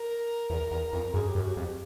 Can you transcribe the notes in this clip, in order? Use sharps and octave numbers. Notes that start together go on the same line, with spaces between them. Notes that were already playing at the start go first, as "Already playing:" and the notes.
Already playing: A#4
E2
E2
F2
F#2 G#4
G4
F#2
F#4
G#4
F2 G4